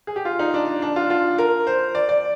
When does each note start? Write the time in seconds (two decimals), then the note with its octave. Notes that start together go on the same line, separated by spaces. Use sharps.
0.07 G#4
0.16 G4
0.25 F4
0.39 D#4
0.54 D4
0.82 D4
0.96 F4
1.10 F4
1.38 A#4
1.67 C5
1.95 D5
2.09 D5